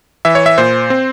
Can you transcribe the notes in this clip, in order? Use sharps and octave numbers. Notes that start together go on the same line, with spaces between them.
E3 E5
C#5
E5
A#2 C5
C4